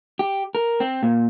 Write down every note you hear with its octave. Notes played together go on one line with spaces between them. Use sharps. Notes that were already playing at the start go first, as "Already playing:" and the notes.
G4
A#4
C4
A#2